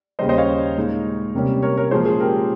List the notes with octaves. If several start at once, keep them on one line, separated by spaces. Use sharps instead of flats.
D#2 C#3 G3 C5 D#5
C5 D#5
C#5 F5
A#2 G#3 D#4
C3 G3 A#3 C#4
A#4 C#5
A#4 C#5
A#2 F3 G#3 C#4 F4 G#4 C5
G#4
G4 A#4